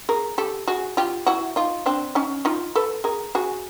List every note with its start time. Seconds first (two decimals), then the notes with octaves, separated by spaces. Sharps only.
0.09 G#4 A#4
0.38 G4 A4
0.68 F#4 G#4
0.97 F4 G4
1.26 E4 F#4
1.56 D#4 F4
1.86 C4 D4
2.15 C#4 D#4
2.45 D#4 F4
2.75 A4 B4
3.04 G#4 A#4
3.35 F#4 G#4